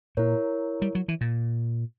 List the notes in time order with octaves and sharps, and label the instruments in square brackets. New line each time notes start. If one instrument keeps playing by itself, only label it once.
[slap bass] A#2 [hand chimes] E4 A#4 C#5
[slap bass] G3
F#3
E3
A#2